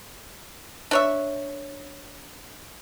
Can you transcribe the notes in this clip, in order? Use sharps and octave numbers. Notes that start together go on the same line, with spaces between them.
D4 C#5 E5